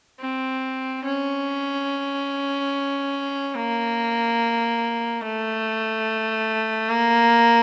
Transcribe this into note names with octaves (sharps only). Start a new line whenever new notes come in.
C4
C#4
A#3
A3
A#3